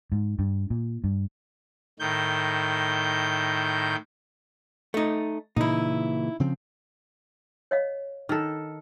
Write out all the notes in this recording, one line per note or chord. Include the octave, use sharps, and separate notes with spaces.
G#2
G2
A#2
G2
A2 D#3 G6
A3 D#4
A#2 C#3 E3 D#4 E4
C#3 F3 C4
C#5 D#5 F5
D#3 A4